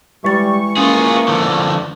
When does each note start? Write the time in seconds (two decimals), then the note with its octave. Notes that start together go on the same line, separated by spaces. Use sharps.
0.25 E3 G3 G#3 C#6 A6
0.77 A#3 C#4 F4 G#4
1.28 D3 F3